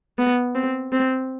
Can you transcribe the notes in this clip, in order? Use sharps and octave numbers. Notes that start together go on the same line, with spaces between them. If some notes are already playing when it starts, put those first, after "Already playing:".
B3
C4
C4